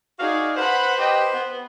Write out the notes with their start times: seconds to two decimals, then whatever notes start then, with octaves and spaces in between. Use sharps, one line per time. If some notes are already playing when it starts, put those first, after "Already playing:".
0.19 D#4 F#4 G#4 D5 F5
0.56 B4 C5 F#5 B5
0.98 G4 D#5
1.33 B3